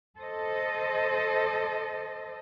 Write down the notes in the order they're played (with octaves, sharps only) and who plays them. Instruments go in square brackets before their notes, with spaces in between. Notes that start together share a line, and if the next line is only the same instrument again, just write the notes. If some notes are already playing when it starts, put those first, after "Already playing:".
[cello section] A4 C5 D#5